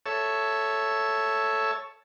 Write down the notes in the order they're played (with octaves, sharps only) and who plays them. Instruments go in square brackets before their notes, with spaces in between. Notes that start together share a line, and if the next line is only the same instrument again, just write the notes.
[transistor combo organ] A4 C#5 E5